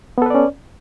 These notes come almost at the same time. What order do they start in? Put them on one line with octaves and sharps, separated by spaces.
B3 A4 B4 D5 C#4